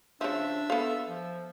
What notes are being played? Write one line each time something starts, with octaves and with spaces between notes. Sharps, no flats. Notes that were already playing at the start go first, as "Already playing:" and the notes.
C#3 F3 D4 E5
B3 A4 F5
F3